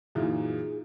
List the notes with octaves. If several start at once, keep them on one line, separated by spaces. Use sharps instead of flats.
F#2 A#2 E3 D#4 F4 G#4 E5